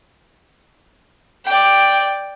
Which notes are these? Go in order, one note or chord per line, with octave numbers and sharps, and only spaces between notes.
D5 G5